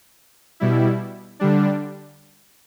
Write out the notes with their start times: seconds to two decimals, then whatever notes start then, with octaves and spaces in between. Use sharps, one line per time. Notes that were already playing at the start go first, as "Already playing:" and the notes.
0.60 B2 G3 E4
1.40 D3 G3 D4